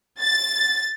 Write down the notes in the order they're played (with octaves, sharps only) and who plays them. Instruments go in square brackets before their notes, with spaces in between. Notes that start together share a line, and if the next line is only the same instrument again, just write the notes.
[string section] A6